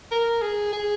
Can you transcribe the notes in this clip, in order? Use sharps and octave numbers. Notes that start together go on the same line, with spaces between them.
A#4
G#4
G#4